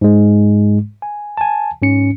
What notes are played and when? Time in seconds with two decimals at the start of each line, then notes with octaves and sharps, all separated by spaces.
0.01 G#2 G#3
1.02 G#5
1.37 G#5 A5
1.82 G#2 C#4 C#7